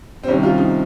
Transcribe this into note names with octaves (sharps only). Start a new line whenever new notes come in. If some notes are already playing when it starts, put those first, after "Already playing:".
C4
C2 C3 D#3 C#4
F4
D#4